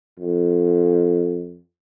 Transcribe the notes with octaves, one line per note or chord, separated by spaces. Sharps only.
F2